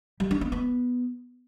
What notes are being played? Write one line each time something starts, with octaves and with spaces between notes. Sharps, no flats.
G3
D4
B3
B3